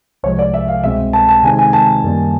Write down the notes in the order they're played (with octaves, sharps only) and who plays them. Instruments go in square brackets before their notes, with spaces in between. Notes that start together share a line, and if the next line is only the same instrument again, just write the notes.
[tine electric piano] C2 C3 F3 G#3 [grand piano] C#5
[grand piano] D5
E5
F5
[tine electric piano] C2 B2 G#3 C4 [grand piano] E5
[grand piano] A5
A5
[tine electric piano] C3 D#3 G#3 C4 D#4 [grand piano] G#5
[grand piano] G#5
A5
[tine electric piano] F#2 D#3 G3 A#3